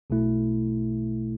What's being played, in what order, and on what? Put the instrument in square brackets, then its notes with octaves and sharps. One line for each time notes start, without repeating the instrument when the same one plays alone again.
[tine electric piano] B1 B2 A3 E4